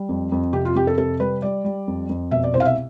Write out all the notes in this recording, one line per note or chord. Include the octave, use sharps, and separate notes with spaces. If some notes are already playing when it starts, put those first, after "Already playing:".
Already playing: G3
F2
F2
C3 G4
F4
F2 G4
A4
C3 A4
G3 B4
G3 D5
G3
F2
F2
B2 E5
D5
C2 C5
F5
E5